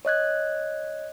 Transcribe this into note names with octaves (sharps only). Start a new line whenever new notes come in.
C#5 D#5 F#6 G#6